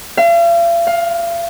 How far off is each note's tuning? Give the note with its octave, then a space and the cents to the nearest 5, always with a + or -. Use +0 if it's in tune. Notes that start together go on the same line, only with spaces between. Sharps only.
F5 -45
F5 +15